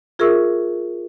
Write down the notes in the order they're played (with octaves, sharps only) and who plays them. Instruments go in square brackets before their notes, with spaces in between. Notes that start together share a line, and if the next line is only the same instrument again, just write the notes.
[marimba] F4 G#4 A#4 E5 C#6 E6